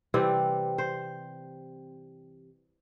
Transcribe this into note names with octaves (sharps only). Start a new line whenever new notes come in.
C3 E3 G3 C4
C5